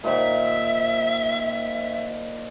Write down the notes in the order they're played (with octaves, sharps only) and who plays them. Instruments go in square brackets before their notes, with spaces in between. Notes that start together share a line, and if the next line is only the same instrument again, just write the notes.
[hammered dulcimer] A#2 D#3 C5 [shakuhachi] E5